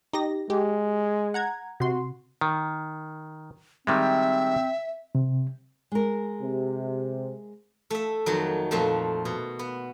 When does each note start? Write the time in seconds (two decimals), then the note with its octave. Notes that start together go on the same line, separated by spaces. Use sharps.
0.13 D#4 G4 A#6
0.50 G#3 G4
1.34 F#5 A#5 G#6
1.80 C3 F#4 C6
2.41 D#3
3.87 D#3 G3 G#3 C4 E5
5.15 C3
5.92 G#3 A#4
6.41 C3
7.90 A3 E5
8.26 F2 D#3 F#3
8.71 F2 A#2 F3 A3
9.25 B2
9.59 B3